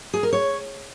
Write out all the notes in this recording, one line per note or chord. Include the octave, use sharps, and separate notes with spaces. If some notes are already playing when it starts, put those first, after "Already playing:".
G#4
A#4
C#5